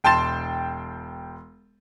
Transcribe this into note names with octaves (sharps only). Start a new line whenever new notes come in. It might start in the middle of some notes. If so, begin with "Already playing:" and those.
E1 G5 A5 C6 A6 E7